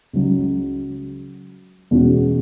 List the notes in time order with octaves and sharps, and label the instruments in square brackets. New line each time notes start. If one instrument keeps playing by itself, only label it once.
[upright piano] C#2 C#3 F#3
E2 B2 G#3 C#4 F#4